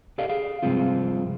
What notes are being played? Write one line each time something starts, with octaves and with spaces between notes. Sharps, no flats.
G4 A4 D5 D#5 F5
G#4 F5
G2 C3 F3 G#3 C4 F4